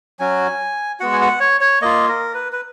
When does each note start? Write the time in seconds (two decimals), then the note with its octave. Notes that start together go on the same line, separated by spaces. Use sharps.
0.19 F#3 C#4 F#4 G#5
1.00 G#3 B3 F#4 F#5
1.13 G#5
1.21 F#5
1.40 C#5
1.61 C#5
1.81 A#3 F4 D#5
2.08 A#4
2.34 B4
2.52 B4